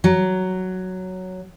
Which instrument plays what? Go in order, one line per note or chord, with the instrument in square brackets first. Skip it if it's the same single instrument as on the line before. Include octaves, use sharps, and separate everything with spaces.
[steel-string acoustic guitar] F#3